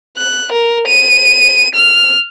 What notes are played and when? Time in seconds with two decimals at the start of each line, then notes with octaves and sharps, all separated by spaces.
0.17 F#6
0.52 A#4
0.87 D#7
1.75 F6